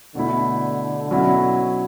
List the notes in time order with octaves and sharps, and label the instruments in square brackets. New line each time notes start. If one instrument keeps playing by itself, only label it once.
[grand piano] B2 A3 E4 [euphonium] D3
[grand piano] B2 F#3 C#4 E4